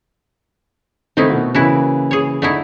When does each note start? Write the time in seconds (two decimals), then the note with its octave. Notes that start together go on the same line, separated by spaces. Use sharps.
1.17 D#3 A3 A#3 C4 D#4 E4
1.29 B2 A3 F#4
1.55 C#3 E3 A#3 E4 F#4
2.11 G#4 C#5
2.42 D3 A3 D#4 E4